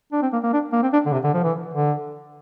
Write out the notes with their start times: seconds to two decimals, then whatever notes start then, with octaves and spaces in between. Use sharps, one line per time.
0.12 D4
0.22 C4
0.33 A#3
0.43 A#3
0.53 D4
0.72 A#3
0.82 C4
0.93 D4
1.06 D3
1.13 C3
1.24 D3
1.34 F3
1.43 E3
1.74 D3